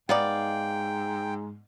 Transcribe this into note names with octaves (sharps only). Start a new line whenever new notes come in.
G#2 B3 D#4 D5 F5 G5